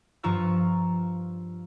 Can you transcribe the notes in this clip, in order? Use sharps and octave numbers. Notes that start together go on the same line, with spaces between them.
G2 F3 F4 A#5 C#6 E6